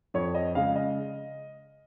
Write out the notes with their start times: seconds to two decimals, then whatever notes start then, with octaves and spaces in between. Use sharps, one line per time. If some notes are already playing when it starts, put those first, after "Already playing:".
0.14 F2 C#5
0.35 D#5
0.55 C#3 G#3 F5
0.76 D#5